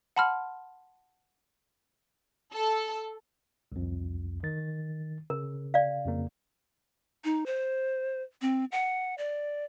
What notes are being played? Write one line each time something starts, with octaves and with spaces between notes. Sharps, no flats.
F#5 A5 B5 C6 F6
A4
C2 F2
D#3 A6
C#3 A#4
D5 F5
F2 C#3 A#3
D#4
C5
C4
F#5
D5